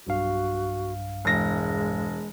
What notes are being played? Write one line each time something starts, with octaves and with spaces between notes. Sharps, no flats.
B1 G2 F#4 F5
E1 G#3 A#6